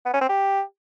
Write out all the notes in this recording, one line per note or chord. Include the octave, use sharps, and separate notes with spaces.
B3
C#4
C4
G4